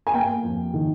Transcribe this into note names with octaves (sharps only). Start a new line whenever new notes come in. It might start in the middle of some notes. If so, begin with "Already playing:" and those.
G#5
A#3 G5
F2
D#3